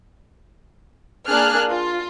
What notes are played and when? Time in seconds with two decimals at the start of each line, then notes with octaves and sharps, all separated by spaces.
1.27 A#3 D4 G#4 F6 F#6
1.68 F4